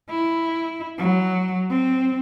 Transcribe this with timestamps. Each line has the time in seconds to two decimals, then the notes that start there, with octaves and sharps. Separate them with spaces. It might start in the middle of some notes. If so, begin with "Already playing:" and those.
0.10 E4
0.98 F#3
1.70 C4